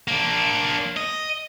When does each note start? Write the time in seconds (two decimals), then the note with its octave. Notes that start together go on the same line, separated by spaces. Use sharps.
0.08 A#3 D4
0.97 D#5